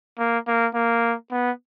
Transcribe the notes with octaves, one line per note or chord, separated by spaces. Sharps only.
A#3
A#3
A#3
B3